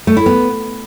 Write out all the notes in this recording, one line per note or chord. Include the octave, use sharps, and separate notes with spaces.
A3
E4
B3